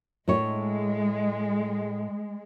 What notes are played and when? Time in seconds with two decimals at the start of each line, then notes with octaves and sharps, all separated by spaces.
0.28 A2 G#3 A4 C#5